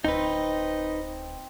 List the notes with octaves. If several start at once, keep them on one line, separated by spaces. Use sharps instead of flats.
D1 C4 D#4 B4 D#5